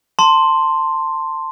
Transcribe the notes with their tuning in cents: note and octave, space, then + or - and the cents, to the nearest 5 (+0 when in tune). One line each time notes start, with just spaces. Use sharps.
A5 +25 C6 +0